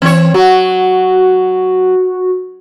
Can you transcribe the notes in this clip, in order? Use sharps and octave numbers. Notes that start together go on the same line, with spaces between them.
E3 C4 C#5
F#3 F#4